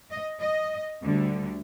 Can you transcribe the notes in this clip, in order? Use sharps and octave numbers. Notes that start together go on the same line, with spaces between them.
D#5
D#5
D2 D3 G3